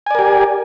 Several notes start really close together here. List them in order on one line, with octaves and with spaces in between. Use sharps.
G#5 D5 A#4 G4